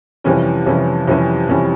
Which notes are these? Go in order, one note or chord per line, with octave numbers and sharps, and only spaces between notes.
F2 C3 E3 G3 C#4
F2 C3 E3 G3 C#4
F2 C3 E3 G3 C#4
F2 C3 E3 G3 C#4